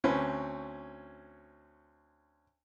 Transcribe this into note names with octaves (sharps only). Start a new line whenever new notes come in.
D2 C4 C#4 B4